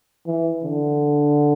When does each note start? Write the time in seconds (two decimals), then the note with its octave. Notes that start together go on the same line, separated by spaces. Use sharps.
0.26 E3
0.64 D3